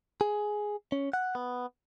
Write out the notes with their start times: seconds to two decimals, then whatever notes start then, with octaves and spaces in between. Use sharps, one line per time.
0.21 G#4
0.92 C#4
1.13 F#5
1.35 B3